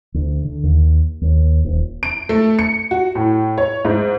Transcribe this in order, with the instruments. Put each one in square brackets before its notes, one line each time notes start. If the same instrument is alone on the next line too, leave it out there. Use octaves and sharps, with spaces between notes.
[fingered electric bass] D2
D3
D#2
D#2
D#1
[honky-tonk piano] D7
A3
C#7
F#4
A2
C#5
G#2